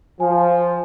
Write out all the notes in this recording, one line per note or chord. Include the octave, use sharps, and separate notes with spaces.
F3 G#5